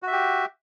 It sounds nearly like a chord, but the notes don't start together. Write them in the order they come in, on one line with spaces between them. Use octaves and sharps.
F#4 E5 G4